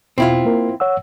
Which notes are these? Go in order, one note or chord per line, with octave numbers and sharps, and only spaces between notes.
E2 B2 C4 E4 F4
A#3 A#4
C#5 F#5 E6